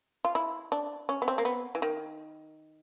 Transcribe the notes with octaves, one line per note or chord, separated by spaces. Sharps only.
F4
E4
D4
C#4
B3
C4
A#3
B3
E3
D#3